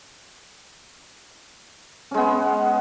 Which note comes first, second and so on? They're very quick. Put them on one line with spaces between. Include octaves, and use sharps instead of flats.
C#4 G#3 B3